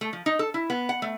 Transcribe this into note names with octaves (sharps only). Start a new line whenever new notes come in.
A3
F3
D#4
A4
E4
B3
F#5
A3